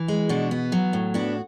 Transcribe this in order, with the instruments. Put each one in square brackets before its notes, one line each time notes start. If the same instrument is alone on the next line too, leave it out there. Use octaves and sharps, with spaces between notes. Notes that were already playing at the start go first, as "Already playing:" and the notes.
Already playing: [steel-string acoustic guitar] E3
G#3
B2 D4 F#4
B3
F#3
A2
B3 D4 F#4